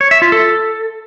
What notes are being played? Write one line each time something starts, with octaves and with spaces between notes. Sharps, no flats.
C#5
E5
F4
A4